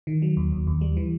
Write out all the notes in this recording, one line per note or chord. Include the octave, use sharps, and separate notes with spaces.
D#3
F#3
D#2
D#2
D#2
G3
E3